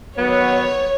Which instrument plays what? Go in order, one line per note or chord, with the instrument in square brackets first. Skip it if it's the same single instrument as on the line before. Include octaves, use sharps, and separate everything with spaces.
[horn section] D#3 F#3 B3 [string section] C#5